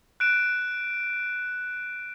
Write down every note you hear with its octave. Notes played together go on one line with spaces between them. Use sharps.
F#6 D7 E7